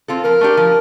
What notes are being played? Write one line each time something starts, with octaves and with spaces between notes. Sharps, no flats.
C4 F4 A4
F3 A#4
A3 D4 G4
F3